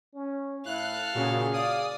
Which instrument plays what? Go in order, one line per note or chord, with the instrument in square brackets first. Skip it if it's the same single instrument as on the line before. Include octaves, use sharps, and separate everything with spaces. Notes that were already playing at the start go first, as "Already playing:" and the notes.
[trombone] C#4
[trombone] A2 [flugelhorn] E4 [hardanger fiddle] A4 F5 [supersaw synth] F#6
[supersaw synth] A#2 C#3 [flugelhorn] F#4 [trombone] G#4
[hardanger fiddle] D5 [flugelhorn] F5 [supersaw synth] D#6